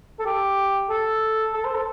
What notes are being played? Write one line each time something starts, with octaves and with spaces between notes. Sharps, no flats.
A4
G4
A4
A4
C5
A4